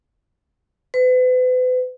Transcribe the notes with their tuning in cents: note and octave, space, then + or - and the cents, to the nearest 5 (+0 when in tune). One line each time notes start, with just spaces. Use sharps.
B4 +40